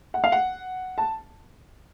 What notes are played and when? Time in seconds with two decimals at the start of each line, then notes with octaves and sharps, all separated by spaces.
0.14 F#5
0.24 F5
0.32 F#5
0.98 A5